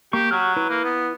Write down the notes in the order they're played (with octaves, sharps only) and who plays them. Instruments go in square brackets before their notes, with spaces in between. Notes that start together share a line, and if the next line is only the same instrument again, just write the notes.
[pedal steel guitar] A#3 C#6 [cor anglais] G4
[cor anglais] F#3 [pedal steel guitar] F#4 F6
[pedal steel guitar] E4 B4
[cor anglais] A#3
B3